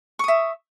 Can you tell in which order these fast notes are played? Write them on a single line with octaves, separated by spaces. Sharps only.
C#6 D#6 E5